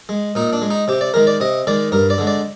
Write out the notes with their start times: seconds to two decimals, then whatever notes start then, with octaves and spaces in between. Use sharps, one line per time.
0.09 G#3
0.35 A#2 D#4
0.53 D4
0.62 G#3
0.70 D#4
0.88 C3 G4
1.01 D5
1.14 D#3 G#3 A#4
1.27 D5
1.40 C3 D#5
1.67 D#3 G#3 D5
1.92 G2 A#4
2.10 D5
2.18 D3 G#3
2.27 D5